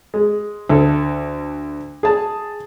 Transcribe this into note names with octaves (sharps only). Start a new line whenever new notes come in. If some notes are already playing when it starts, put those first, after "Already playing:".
G#3
D2 A4
G#4 A5